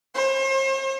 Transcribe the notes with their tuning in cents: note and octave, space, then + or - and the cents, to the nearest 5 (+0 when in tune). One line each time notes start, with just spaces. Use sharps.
C5 +40